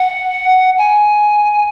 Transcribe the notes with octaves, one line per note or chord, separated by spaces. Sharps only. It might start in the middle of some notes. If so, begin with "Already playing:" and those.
Already playing: F#5
G#5